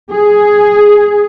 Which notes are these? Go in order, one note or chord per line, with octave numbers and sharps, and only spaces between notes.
G#4